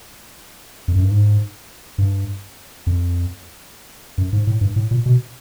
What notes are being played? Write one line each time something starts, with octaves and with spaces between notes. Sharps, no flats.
F2
F#2
G2
G#2
G2
F2
F#2
G#2
A2
G2
A2
A#2
B2